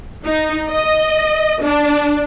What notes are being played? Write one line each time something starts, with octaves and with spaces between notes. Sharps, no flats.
D#4
D#5
D4